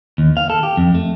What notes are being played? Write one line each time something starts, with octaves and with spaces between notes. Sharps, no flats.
D#2
F5
A4
G4
F2
A3